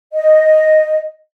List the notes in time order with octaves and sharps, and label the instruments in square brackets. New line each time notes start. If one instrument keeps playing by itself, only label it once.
[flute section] D#5